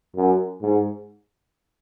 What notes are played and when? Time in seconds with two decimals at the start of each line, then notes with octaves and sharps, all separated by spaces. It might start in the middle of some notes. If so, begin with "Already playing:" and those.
0.16 F#2
0.62 G#2